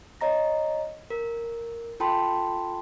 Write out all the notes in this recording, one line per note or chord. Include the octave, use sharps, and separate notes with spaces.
C#5 D#5 A#5 A#6
A#4
F4 A4 G5 A5 B5 C6